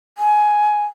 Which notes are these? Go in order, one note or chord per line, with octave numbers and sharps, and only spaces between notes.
G#5